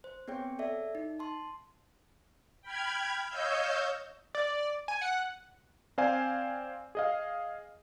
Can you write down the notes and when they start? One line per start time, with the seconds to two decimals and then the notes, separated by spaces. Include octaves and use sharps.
0.04 C5
0.28 B3 C4 G#4 C#5 G5
0.59 A4 D5 E5
0.95 D#4
1.19 A5 C6
2.61 G5 B5 F6 G#6
3.27 C#5 D#5 F5 E6 G6
4.35 D5
4.88 G#5
5.01 F#5
5.98 C4 C5 D5 F5 G#5
6.95 G#4 D#5 F5